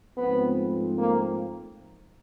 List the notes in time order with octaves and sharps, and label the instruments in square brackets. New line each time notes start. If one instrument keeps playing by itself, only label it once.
[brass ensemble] G#2 F3 A3 C4 [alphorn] B3
[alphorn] A#3